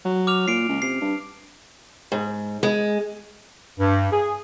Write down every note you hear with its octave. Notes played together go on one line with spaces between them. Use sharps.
F#3
D6 F6 F7
A#2 C7 D7
C#2
C3 C7
G2
G#2
G#3
G2
G#4